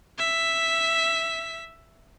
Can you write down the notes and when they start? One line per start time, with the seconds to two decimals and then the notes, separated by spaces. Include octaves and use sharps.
0.18 E5 B6